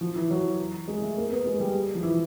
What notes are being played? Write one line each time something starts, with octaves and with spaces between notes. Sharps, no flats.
F3
E3
F#3
G#3
A3
A#3
B3
G#3
G3
F3
E3